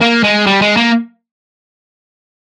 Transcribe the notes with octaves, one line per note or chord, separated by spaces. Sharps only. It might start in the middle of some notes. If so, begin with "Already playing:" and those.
A#3
G#3
G3
G#3
A#3